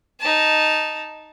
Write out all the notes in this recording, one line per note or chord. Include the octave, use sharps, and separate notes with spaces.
D#4 A5